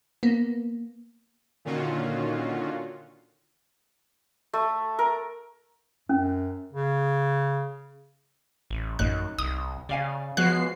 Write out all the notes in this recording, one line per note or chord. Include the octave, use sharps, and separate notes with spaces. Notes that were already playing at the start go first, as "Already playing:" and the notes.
A#3 B3
A#2 D3 D#3 C#4 F4 F#4
A3
A#4
F#2 C#4
C#3
A1
A1 F#2 D#4 F#6
C2 D#6
C#3 D5 F5 G#5
F3 G#3 B3 F#4 C#5 F#6 C7